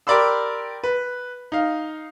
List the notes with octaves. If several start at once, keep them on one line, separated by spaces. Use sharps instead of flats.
G4 A#4 D5 B5 C6 E6
B4
D#4 F5